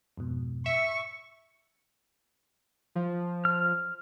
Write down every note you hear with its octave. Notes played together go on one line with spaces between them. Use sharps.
F2 G#2 B2
E5 C#6
F3
F6